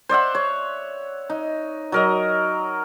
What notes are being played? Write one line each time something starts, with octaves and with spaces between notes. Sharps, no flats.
C5 D5 E5 F#5
C#5
D#4
F#3 A#4 D#5